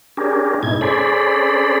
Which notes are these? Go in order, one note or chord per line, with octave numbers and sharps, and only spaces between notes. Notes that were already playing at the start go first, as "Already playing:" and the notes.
C#4 D4 G4 G#4 A#4
G#2 B2 D#4 E4 G#6
C#4 G#4 A4 C5 D5 B5